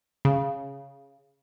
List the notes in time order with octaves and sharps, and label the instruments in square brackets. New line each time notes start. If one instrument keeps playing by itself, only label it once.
[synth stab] C#3